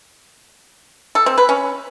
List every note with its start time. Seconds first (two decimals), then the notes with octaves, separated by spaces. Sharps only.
1.15 A4
1.26 C4
1.38 B4
1.49 C#4